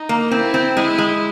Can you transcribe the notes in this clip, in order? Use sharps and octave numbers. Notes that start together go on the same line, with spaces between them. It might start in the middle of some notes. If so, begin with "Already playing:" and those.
Already playing: D#4
A#3
C4 E4
C4
G#3 E4
G#3